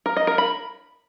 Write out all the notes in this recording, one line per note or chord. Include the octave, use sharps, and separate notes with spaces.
A#4
D#5
A#4
B5